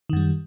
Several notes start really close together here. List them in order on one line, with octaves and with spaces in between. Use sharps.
D#3 F#2 G3